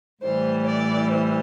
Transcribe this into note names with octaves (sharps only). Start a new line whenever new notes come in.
A2 E3 G3 C5
D5
C5